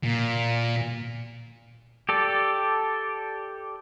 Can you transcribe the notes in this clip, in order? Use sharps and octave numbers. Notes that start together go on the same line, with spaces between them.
A#2
G4 A4 D5